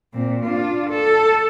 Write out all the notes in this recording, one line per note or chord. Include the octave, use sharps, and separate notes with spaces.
A#2 C4
D4 F4
A4